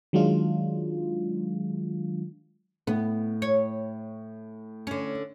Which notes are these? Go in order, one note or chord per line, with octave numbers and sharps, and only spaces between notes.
D#3 F#3 G#3 D4 F4
A2 B3
C#5
D3 C#4